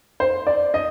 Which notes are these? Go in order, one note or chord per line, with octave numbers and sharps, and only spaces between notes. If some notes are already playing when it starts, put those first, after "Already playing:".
C5
D5
D#5